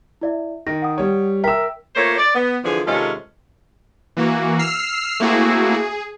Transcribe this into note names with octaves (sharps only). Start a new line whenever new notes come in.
E4 D5 E5
D#3 A#6
F#5 D#6
G3 C#5
A#4 E5 G5 E6 B6
A3 A#3 F4 C5 C#5
D5
B3
D3 E3 F3 G#4
C3 D#3 G#3 C#4 F4 A4
E3 A#3 F#4
E6 F6 C7
A3 A#3 C4 E4 F#4 G#4
G#4